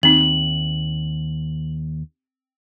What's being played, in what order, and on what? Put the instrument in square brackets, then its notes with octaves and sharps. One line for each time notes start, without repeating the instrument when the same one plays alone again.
[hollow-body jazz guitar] D#2 [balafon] C4 D#4 [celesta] F#7